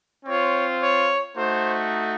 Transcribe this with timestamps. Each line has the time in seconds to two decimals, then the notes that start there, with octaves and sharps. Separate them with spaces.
0.25 C4 F4 C#5
0.80 C#5
1.35 A3 D#4 F#4 C5